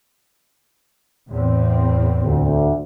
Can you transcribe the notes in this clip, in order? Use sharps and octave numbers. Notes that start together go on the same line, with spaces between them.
E2 A2 C4
D2